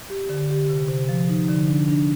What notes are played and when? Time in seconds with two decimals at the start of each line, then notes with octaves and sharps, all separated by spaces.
0.10 G4
0.29 D3
0.50 G4
0.69 C3
0.89 C3
1.09 F3
1.29 D#4
1.49 D3
1.68 D4
1.88 D4